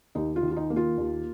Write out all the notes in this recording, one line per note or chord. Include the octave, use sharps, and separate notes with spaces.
D#2 D#4
F4
D#3
F4
D#4
A#3
F4
D#2